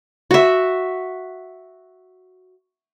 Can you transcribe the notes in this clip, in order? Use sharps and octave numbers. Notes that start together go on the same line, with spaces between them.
F#4 E5